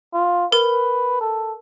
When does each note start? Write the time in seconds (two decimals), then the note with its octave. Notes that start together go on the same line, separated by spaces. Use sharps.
0.14 F4
0.52 A#4 B4
1.21 A4